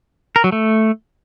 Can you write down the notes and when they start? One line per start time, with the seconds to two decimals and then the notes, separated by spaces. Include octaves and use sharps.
0.36 A#4
0.44 F#3
0.52 A3